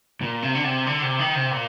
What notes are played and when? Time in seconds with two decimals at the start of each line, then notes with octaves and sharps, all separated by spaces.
0.21 A#2
0.43 C3
0.55 D3
0.64 C3
0.86 D3
1.02 C3
1.19 D#3
1.35 C3
1.51 A#2